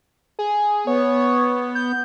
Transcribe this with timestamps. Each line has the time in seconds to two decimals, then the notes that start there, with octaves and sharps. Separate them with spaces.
0.39 G#4
0.87 B3 C#5
1.75 G6